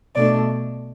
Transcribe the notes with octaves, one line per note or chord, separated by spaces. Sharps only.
B2 A3 D4 D5